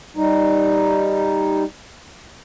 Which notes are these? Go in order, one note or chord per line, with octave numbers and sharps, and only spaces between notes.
G3 D#4